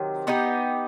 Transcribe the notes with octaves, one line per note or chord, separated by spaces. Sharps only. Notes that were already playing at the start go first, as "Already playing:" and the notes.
Already playing: C3 D#3 F#3
B3 D#4 G4